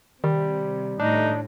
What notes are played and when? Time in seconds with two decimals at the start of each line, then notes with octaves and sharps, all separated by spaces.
0.24 C3 D#3 G3
0.99 A2 G3 D4 D#4